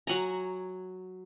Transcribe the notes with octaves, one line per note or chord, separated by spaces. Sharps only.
F#3 F#5 G#5 A#5